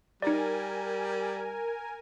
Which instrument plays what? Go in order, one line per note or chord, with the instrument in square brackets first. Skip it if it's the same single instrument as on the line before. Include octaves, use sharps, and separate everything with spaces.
[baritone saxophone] G3 [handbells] D#4 D5 [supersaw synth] A#4 G#5